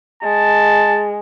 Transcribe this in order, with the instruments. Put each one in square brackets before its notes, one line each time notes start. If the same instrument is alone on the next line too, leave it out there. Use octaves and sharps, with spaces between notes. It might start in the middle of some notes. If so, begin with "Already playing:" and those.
[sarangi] G#3 [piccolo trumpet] A5